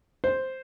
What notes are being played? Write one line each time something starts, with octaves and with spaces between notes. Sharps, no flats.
C5